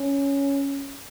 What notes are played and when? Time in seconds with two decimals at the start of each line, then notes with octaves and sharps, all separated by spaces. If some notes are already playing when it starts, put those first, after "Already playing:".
Already playing: C#4